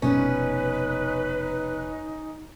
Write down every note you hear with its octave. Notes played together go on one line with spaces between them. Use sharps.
F1 B2 G3 C#4 D#4 B4